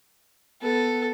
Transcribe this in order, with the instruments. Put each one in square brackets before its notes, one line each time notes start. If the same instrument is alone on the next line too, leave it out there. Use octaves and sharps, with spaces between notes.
[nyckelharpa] B3 [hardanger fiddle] A4